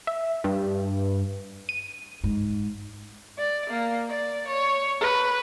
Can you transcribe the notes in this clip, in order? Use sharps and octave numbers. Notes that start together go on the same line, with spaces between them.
E5
G2
D#7
G#2
D5
A#3
D5
C#5
B4